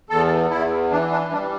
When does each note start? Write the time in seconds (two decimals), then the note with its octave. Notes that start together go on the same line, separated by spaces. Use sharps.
0.10 E2 A4
0.50 E2 E4
0.91 E3 D4
1.11 D4
1.31 G3 D4